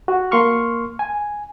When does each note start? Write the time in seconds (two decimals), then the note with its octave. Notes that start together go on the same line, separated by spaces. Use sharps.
0.08 F#4
0.31 A#3 C6 C#6 F6
0.99 G#5